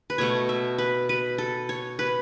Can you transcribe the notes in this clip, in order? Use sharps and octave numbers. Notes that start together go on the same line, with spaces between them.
B4
B2 A3 C#5
E5
B4
B4
A4
C#5
B4